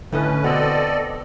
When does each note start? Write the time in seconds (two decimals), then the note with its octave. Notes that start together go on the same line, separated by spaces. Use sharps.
0.12 A2 D3 C#4 A4 B4 D#5
0.44 B2 C4 A4 D5 D#5